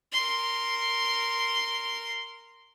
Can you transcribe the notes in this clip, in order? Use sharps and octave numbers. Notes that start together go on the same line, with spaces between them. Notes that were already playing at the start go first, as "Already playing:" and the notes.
A#4 C6